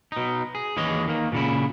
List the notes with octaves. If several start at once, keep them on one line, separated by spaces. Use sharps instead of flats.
B2 D#4
G#4
D#2 E3 G#4 C#5 D#5
D#3 A#3
A#2 C#3 E4